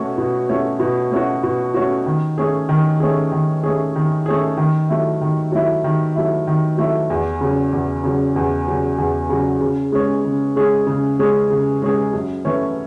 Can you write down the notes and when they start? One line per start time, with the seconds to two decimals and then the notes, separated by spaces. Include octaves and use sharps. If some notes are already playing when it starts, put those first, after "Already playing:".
Already playing: B2 A3 C#4 F#4
0.18 B2
0.49 A3 C#4 F#4
0.80 B2
1.11 A3 C#4 F#4
1.43 B2
1.74 A3 C#4 F#4
2.06 D#3
2.38 A3 C#4 G#4
2.69 D#3
3.00 A3 C#4 G#4
3.32 D#3
3.63 A3 C#4 G#4
3.96 D#3
4.26 A3 C#4 G#4
4.57 D#3
4.89 F#3 A3 E4
5.21 D#3
5.52 F#3 A3 E4
5.84 D#3
6.16 F#3 A3 E4
6.47 D#3
6.78 F#3 A3 E4
7.10 E2
7.41 C#3 F#3
7.73 E2
8.04 C#3 F#3
8.36 E2
8.68 C#3 F#3
8.98 E2
9.29 C#3 F#3
9.61 C#3
9.92 G#3 C#4 G#4
10.25 C#3
10.56 G#3 C#4 G#4
10.87 C#3
11.19 G#3 C#4 G#4
11.50 C#3
11.82 G#3 C#4 G#4
12.13 F#2
12.45 E3 A3 C#4